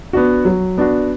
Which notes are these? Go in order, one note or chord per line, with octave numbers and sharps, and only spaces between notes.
B3 D4 F#4
F#3
B3 D4 F#4